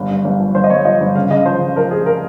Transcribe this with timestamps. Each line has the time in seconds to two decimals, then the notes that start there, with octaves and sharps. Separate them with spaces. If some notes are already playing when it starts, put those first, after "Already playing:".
Already playing: G1
0.10 G2
0.24 G1
0.40 F3
0.55 G1 C5
0.64 D#5
0.70 G1 C#5
0.85 F3 D#5
1.00 G1
1.15 C#3 F5
1.31 C#3 D#5
1.46 F3 C5
1.61 C#3
1.76 F3 A#4
1.91 F1 G#4
2.06 A#4